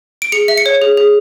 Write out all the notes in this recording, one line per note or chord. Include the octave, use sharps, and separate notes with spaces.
D7
G#4 C#7
E5
C#7
C#5
G#4
G#4